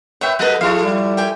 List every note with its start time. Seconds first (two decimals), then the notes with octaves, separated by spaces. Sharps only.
0.21 B4 C#5 E5 G5
0.39 F#3 A4 B4 D#5 F#5
0.61 F3 E4 G#4 A4 F5
0.84 G3
1.17 G4 G5 G#5